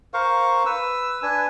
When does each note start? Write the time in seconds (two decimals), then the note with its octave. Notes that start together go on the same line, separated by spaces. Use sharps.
0.14 A#4 C5 F5 C#6
0.66 B4 E6
1.23 D4 B4 G#5